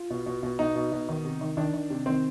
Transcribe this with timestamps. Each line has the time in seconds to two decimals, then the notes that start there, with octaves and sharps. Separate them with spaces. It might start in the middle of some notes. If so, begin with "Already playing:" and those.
Already playing: F4
0.10 B2
0.26 B2
0.43 B2
0.59 B2 D#4
0.75 B2
0.92 B2
1.09 D#3
1.25 C3
1.41 D#3
1.57 D#3 D4
1.73 D#3
1.90 C3
2.06 D#3 C4